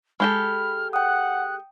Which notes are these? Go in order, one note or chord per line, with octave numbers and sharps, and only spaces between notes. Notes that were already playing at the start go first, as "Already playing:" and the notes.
G#3 G4 A4 B5 F6
F#5 G5 D#6 F#6